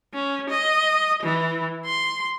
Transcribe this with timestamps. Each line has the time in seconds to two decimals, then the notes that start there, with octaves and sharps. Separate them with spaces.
0.14 C#4
0.49 D#5
1.23 E3
1.85 C6